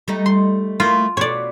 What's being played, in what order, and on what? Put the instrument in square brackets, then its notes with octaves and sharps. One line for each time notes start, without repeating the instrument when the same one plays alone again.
[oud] G3 A3 D#4
[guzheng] C6
[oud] A3 A#3 E4 [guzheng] F4
[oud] B2 [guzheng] C#5 D5